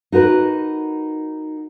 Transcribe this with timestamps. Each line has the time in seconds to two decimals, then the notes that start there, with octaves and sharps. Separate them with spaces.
0.12 D#4 F#4 A#4 B4